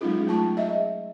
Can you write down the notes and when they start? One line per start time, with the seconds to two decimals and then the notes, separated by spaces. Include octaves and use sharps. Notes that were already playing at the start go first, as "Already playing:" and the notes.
0.01 F#3 G#3 C#4 D#4 F4 G#4
0.27 A3 F4 A5 C#6
0.57 G#4 D#5 E5